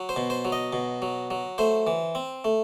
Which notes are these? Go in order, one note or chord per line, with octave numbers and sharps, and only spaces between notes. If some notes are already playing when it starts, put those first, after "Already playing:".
Already playing: F#3
C5
B2
C5
F#3
D#5
B2
F#3
F#3
A3 C5
E3
C4
A3